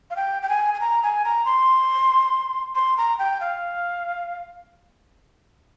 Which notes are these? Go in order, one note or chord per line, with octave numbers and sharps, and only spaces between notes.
F5
G5
G5
G#5
G#5
A#5
G#5
A#5
C6
C6
A#5
G5
F5